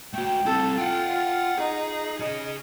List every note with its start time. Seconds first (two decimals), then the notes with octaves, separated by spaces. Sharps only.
0.14 A3 F#4 G5
0.46 C4 E4 A4
0.78 F4 F#5 G5
1.58 D#4 G#4
2.19 G#4 C#5 D#5